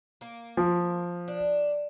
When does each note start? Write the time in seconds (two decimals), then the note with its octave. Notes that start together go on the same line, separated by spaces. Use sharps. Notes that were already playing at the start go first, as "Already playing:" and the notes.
0.21 A#3
0.57 F3
1.28 D4